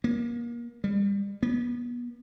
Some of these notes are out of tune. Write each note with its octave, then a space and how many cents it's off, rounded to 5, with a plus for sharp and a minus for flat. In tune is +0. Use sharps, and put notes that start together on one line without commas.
A#3 +30
G3 +30
B3 -30